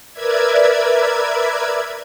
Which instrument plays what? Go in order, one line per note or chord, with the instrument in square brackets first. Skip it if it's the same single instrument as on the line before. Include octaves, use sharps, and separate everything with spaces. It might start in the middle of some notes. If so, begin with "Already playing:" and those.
[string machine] A#4 B4 D5 E5 G#6